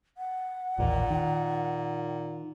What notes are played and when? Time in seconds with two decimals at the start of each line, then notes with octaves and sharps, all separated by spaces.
0.17 F#5
0.78 A1 D#2 A#2
1.10 D#3